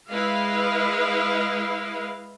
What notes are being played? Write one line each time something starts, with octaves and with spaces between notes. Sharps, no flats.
G#3 E4 B4 D#5 F5